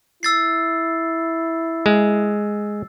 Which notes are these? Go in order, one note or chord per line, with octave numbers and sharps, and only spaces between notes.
E4 E6 A6 C7
G#3